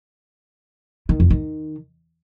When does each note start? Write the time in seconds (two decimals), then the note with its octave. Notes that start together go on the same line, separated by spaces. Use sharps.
1.09 D#3
1.20 F2
1.30 D#3